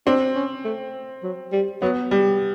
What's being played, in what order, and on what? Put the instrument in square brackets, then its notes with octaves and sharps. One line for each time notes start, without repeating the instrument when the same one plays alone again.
[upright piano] C4 [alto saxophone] D4
[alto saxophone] C#4
A3
F#3
G3
[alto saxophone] F#3 [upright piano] B3
[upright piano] G3